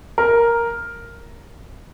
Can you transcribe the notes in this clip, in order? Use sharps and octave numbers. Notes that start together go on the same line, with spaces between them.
A#4